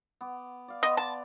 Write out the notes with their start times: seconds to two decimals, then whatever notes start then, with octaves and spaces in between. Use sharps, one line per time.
0.21 B3 D6
0.68 D5 F5
0.83 B3 D#5 B5 C6
0.97 D5 A5